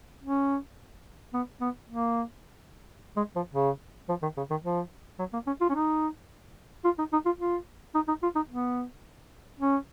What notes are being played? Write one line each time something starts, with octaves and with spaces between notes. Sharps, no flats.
C#4
B3
B3
A#3
G#3
F3
C#3
F3
D#3
C#3
D#3
F3
F#3
A#3
C#4
F4
C#4
D#4
F4
D#4
D#4
F4
F4
D#4
D#4
F4
D#4
B3
C#4